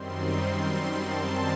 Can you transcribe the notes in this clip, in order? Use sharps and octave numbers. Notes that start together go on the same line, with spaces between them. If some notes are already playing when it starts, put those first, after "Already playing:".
Already playing: F#2 D#3 G3 C4 C6
C6
A5